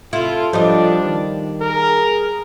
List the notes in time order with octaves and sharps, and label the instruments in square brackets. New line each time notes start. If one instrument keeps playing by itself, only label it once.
[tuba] C3 [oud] E4 [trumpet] F4 [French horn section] A4
[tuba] F3 [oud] G3 D#5 [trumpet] D4
[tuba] D#3
[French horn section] G#4 [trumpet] A#4